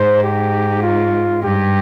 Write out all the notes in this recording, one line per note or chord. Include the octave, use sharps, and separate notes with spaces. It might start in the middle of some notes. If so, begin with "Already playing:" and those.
Already playing: G#2 C5
G4
F4
G2 G4